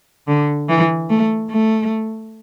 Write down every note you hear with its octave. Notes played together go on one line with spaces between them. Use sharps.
D3
E3
A3
A3